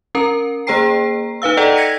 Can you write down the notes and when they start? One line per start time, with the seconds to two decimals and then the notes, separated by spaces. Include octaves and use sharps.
0.15 C#4 A#4 A#5
0.67 A#3 G#4 C5 G5 A#5 C7
1.42 D#4 B4 F5 E6
1.57 A4 D5 D#5 F#5 G5 A#5
1.76 G#6 A#6 B6 C#7 D#7